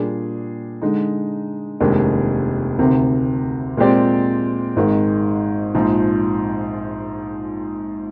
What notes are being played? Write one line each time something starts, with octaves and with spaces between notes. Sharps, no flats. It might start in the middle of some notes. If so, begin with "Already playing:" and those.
Already playing: A#2 G3 D4 G#4
D3 G#3 D#4
F1 D#2 D#3 G#3 D4
D2 C3 D#3
A#2 G#3 C4 G4 D5
G#1 G#2 D#3 G#3
A#1 G#2 F3